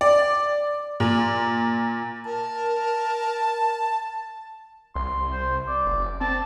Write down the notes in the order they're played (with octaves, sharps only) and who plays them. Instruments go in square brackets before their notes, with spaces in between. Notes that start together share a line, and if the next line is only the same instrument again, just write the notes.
[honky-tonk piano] D5
A#2
[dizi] A#4 [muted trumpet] A5
[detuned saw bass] C2 [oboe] C6
[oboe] C5
D5
[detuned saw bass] F#1
[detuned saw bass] C4 [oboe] A5